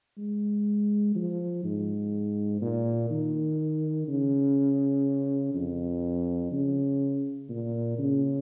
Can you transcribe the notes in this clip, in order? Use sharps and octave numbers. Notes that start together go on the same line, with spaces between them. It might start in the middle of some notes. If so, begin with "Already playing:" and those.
G#3
F3
G#2
A#2
D#3
C#3
F2
C#3
A#2
C#3